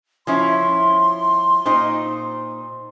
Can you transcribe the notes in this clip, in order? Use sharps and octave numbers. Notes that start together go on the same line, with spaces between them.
F3 C#4 E4 C6
A#2 D#4 C5